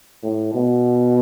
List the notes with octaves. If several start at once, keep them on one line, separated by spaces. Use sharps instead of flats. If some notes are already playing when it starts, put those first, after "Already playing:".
A2
B2